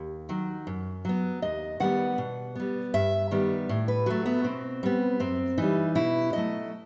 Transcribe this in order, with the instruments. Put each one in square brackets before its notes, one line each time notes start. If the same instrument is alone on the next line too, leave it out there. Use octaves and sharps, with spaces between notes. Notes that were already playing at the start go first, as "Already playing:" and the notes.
Already playing: [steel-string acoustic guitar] D#2
D#3 F#3
F#2
F#3 B3
D#2 D#5
D#3 G3 B3 F#5
B2
G3 B3
G2 E5
D#3 G3 B3
A2
B4
F#3 A3 F#4
B3
B2 C4
G3 B3
F#2 C4
E3 G3 D#4
B2 E4
F#3 A3 D#5